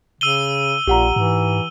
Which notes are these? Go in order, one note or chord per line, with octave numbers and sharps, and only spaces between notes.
C#3 E6 D#7 G7
A#1 A#2 G4 F#5 A#5
G#2 E3